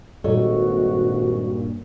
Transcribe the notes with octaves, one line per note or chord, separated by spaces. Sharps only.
G#1 G2 A#2 F#4 A4 C#5 D#5